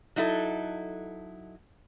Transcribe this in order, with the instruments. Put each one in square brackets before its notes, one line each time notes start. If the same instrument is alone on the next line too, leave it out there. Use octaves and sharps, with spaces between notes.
[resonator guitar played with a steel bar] F#3 D#4 E4 A4